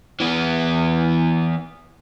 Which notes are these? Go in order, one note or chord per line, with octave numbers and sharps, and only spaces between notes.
E3 B3